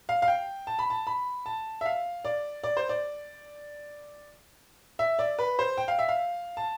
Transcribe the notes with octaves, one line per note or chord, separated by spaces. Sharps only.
F5
F5
G5
A5
B5
A5
B5
A5
E5
F5
D5
D5
C5
D5
E5
D5
B4
C5
G5
F5
E5
F5
A5